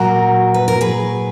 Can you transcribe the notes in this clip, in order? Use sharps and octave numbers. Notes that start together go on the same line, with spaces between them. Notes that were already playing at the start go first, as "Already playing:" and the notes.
Already playing: A#2 F#3 F#4 A#4
B4
A#4
G#4 B4